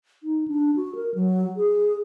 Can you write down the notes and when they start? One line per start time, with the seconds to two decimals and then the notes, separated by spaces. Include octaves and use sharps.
0.23 D#4
0.48 D4
0.76 F#4
0.95 A#4
1.15 F#3
1.56 G#4